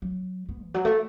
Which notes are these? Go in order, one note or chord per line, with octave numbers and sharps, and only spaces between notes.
F#3
B3
E3
F#3
A3